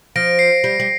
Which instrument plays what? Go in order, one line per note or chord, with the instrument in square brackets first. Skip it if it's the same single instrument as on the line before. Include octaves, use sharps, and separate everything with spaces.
[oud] F3 [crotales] A#6 D7
[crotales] C7
[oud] G3
G3